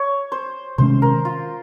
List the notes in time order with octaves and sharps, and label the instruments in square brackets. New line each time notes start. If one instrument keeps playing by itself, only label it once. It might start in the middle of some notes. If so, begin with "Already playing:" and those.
Already playing: [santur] C#5
C5
[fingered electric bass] C3 D#3 G#3 C#4 [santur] C5
[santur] A#4
F4